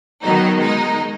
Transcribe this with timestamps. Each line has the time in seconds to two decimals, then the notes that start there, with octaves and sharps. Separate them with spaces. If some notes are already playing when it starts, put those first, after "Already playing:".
0.21 D#3 F#3 B3 D#4
0.59 D#3 G#3 D#4